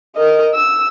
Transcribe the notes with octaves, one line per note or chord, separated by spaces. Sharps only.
A#4 D#5
E6